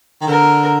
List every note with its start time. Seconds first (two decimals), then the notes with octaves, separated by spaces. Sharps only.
0.21 D#3
0.27 D3 A#4